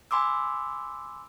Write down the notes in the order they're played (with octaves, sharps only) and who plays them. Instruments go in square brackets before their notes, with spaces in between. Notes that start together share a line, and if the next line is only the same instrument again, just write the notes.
[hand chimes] G#5 B5 C6 D6 E6